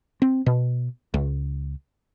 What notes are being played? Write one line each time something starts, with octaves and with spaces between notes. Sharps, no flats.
C4
B2
C#2